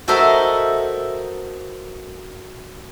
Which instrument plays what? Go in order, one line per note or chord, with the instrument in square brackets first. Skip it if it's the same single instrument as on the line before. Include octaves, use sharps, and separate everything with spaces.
[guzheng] F#4 A4 A#4 C5 D#5 E5